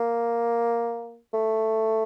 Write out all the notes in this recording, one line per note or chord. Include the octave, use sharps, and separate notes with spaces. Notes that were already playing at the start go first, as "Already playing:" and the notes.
Already playing: A#3
A3